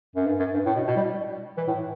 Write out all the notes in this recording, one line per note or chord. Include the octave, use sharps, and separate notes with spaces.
F#2
G2
F#2
G2
A2
B2
B2
G3
E3
A2